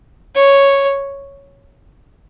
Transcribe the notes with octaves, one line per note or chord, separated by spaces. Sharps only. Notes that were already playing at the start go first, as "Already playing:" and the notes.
C#5